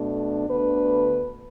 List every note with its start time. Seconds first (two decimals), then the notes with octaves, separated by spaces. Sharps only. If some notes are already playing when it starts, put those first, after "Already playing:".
Already playing: B2 A3 D4
0.48 D2 D3 B3 D4 B4